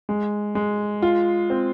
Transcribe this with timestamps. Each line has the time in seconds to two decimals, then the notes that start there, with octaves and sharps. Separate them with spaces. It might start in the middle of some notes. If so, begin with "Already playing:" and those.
0.09 G#3
0.55 G#3
1.02 F4
1.50 C4